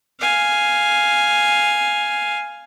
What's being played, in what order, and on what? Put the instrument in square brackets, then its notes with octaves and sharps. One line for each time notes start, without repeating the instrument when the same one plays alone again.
[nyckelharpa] F5 G#5